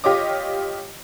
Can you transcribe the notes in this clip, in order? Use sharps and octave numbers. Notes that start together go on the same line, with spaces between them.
F4 G4 C#5 D#5 D6